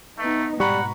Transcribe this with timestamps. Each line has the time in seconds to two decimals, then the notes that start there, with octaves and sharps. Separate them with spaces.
0.19 A3 B3 D#4
0.60 G#2 B2 G3 F#5 A#5 B5 C#6